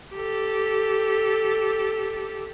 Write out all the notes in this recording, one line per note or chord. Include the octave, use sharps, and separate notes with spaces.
G4 A4